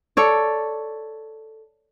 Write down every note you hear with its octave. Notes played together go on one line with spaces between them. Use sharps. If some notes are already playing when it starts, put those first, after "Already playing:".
A4 C#5 D5